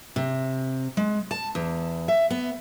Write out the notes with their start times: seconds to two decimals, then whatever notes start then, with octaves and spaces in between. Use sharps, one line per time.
0.16 C3
0.97 G#3
1.31 A5
1.55 E2
2.08 E5
2.30 B3